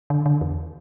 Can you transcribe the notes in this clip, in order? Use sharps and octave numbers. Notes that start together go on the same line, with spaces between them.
D3
D3
E2